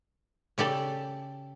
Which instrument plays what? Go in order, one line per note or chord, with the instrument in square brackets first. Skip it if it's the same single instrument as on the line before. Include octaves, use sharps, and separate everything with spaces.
[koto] C#3 G4 A4 D5